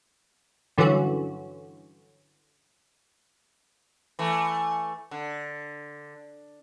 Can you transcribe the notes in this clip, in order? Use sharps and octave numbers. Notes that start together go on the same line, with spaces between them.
G2 D3 E3 F#3 C#4 F#4
E3 A3
D3